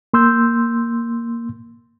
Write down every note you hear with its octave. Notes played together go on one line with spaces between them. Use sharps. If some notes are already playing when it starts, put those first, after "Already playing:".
A#3 C6 E6 G6